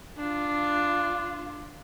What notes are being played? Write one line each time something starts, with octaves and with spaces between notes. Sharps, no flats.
D4 F4